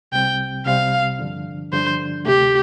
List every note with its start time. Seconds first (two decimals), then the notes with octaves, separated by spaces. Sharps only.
0.12 C2 C3 G3 C4 G5
0.66 C2 C3 G3 C4 F5
1.19 G2 D3 F3 D4
1.73 G2 D3 F3 D4 C5
2.26 D2 C3 A3 G4